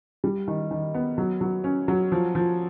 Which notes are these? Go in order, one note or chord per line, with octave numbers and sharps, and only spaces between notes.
G3
D#3
D#3
B3
F#3
F#3
C#4
F#3
F3
F3